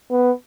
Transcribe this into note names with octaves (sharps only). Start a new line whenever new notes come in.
B3